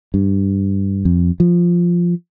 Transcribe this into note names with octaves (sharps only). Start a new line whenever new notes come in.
G2
F2
F3